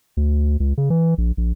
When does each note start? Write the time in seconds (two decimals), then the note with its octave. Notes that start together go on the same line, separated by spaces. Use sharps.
0.17 D2
0.60 C#2
0.78 C#3
0.90 E3
1.18 A#1
1.37 A#1